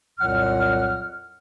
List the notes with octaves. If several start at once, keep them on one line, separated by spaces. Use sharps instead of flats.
C2 F2 A#2 F#3 F#5 F6